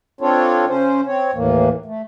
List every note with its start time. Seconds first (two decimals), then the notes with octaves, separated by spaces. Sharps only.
0.21 C4 D4 F4 A4 C#5
0.68 C#3 C#4 C5
1.07 C4 C#5
1.34 D#2 A2 E3 A#3
1.86 A3